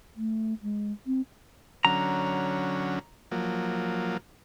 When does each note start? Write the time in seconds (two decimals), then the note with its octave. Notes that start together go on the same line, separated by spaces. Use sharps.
0.17 A3
0.62 G#3
1.06 C4
1.85 D3 F#3 C#4 A#5
3.31 F3 F#3 A#3